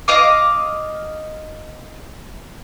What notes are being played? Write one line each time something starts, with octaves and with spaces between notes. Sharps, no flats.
D#5 F5 D6